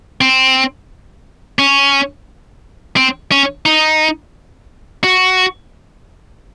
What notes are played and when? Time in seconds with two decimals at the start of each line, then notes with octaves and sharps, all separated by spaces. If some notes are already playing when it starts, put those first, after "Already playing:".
0.21 C4
1.59 C#4
2.97 C4
3.32 C#4
3.66 D#4
5.04 F#4